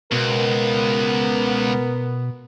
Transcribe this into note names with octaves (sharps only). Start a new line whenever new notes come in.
C#2 B2 B3 A#4